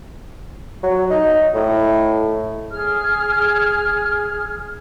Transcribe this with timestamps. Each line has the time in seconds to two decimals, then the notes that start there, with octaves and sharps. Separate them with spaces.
0.83 F#3
1.10 D#4
1.55 A2
2.71 G#4 F6